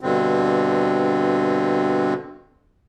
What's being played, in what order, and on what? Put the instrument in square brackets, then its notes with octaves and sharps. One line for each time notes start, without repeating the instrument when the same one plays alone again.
[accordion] G2 B2 D3 C4